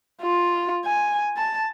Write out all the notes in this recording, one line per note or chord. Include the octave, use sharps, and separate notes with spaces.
F4
G#5
A5